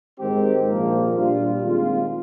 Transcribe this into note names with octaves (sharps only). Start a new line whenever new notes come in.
G#2 D#3 G#3 C4 G4
A#1 A#2 F3 A#3
A#2 G3 D4 F4
D#3 G#3 C4 F4